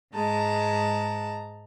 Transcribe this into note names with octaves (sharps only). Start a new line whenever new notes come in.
G#2 G#3 A5 A#5